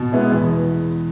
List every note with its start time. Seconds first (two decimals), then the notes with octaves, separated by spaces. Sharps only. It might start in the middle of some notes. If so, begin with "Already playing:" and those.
Already playing: B2
0.12 G#3 B3 E4 G#4
0.30 E2